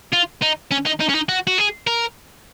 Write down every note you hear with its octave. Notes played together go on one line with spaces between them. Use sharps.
F4
D#4
C#4
D#4
D#4
C#4
D#4
F#4
F#4
G#4
A#4